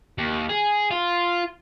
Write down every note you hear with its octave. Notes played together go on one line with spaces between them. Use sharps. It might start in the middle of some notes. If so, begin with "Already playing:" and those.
D#2
G#4
F4